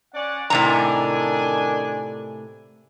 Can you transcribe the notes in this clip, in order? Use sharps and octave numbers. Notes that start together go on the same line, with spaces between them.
C#4 D5 F#5
A2 C3 D#3 D4 G#5 A#5